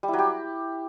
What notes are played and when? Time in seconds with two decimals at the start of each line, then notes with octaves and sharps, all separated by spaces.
0.03 G3
0.08 E4
0.13 F#3
0.19 G4